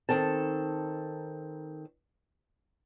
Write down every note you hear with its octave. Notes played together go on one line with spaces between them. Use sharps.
D#3 C4 A4 A5